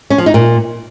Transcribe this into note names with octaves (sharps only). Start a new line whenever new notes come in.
C#4
F3
D#4
A#2